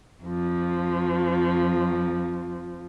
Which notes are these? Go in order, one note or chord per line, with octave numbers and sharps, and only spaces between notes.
F2 F3